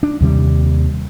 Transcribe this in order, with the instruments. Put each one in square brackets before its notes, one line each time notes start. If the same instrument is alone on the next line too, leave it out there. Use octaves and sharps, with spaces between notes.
[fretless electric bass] D4
D#2 C3 G3